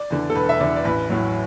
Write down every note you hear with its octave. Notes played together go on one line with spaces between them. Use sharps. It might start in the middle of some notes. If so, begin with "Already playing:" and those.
Already playing: D5
E2 D3
A4
E1 B4
E5
E2 D3 D5
D5
A1 B4
A2 F#3